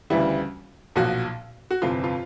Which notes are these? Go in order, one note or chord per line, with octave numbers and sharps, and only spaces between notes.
D2 C#3 E3 G3 E4
B1 A#2 F3 F#4
F#4
G1 F2 C3 E3 F4
F4